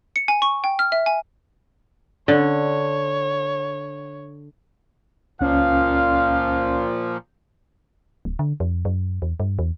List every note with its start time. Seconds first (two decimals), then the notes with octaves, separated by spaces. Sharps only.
0.16 C#7
0.28 G#5
0.42 C#6
0.64 G5
0.79 F6
0.92 E5
1.06 G#5
2.28 D3 C#5
5.41 C#2 A#2 F3 C#4 F5
8.25 D1
8.39 D3
8.60 F2
8.85 F#2
9.22 E2
9.40 G2
9.59 E2